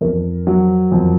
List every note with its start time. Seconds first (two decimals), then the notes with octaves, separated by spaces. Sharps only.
0.01 F2 A#4
0.47 F#3
0.92 F2